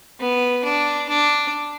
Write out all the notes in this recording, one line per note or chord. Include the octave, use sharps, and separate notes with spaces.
B3
D4
D4